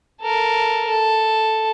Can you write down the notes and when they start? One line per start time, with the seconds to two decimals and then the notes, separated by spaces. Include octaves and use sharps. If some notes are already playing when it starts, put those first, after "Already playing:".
0.21 A4 A#4
0.88 A4